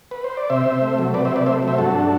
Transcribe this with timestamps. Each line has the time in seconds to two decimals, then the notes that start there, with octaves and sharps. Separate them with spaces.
0.11 B4
0.24 C5
0.37 D5
0.50 C3 C5 E5
0.66 C3
0.82 A3
0.98 F#3
1.14 C3 B4 D5
1.25 C5 E5
1.31 C3
1.36 B4 D5
1.46 A3 C5 E5
1.63 F#3
1.68 C5 E5
1.78 G2 F#4 A4
1.94 D4